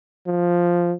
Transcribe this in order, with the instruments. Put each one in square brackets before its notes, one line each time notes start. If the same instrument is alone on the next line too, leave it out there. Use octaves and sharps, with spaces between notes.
[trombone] F3